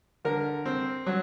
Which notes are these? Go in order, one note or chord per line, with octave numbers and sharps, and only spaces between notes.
D3 A#4
C4
F#3